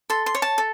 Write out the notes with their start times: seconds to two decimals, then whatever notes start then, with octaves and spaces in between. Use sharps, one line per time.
0.10 A4 C6
0.26 C6
0.35 C#5
0.42 A5
0.58 A4